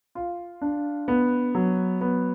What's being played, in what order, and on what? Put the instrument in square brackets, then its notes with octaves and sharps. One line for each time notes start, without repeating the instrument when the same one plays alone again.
[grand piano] F4
D4
B3
F#3
B3